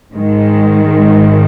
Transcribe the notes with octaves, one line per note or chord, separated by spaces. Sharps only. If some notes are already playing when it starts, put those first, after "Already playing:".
G#2 D#3 G#3